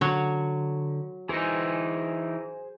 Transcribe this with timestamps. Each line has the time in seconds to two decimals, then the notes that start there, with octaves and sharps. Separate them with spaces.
0.01 D3 F#3 C#5
1.29 E3 D#4 G#4 C5 G#5